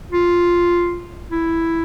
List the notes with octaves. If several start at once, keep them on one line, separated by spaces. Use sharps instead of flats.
F4
E4